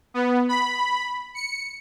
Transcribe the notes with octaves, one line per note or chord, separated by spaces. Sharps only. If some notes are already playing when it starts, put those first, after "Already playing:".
B3
B5
C#7